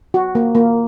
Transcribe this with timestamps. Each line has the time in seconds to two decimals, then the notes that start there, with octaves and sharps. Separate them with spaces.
0.14 F#4
0.35 A#3
0.55 A#3